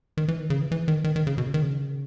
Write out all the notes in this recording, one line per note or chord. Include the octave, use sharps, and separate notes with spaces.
D#3
E3
D#3
C#3
E3
E3
D#3
D#3
D#3
C#3
B2
C#3
D#3
C#3